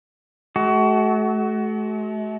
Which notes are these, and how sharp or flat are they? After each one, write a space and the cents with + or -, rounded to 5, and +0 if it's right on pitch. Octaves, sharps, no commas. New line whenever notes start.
A3 -40 F#4 +25